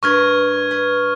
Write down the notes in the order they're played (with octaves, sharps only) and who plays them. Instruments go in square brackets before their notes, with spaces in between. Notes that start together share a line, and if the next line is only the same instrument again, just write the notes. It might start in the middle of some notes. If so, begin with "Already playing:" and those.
[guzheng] G2 A#4 B4 [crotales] C#6 F6 G#6
[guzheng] B4